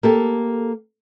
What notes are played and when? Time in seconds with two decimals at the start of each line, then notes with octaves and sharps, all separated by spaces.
0.03 A#3 G4 A4